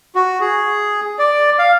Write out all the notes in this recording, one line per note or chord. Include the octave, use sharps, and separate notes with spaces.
F#4
G#4
D5
F5